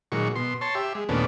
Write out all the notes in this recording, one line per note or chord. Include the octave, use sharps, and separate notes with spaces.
A#2 D#3 F#3 G#3 C#6
B2 C6
C#5 A5 C6
G4 E5
G#3
D#2 A#2 A3 B3 C#4 D4